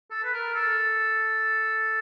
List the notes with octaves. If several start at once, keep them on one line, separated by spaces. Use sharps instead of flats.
A4
B4
A#4
A4